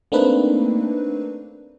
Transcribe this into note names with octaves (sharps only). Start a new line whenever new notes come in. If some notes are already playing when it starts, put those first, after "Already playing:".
A3 A#3 C4 D4 D#4 B4